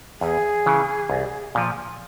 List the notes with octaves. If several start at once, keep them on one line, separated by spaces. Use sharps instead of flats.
E2 G#4
C#3 E3
C2
A#2 F3